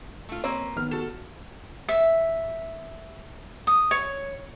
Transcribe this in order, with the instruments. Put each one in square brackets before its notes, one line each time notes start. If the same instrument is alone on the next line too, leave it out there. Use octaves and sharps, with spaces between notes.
[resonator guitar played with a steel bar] A3 F4
[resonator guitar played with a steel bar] A#3 C4 B4 [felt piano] C#5
[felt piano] D#3 B3 F6
[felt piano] F#4 E7 [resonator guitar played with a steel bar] A4
[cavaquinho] E5
D#6
C#5